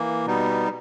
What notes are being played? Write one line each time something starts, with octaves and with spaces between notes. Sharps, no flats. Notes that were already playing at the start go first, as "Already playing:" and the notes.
Already playing: E3 A#3
B2 G3 B3 D#4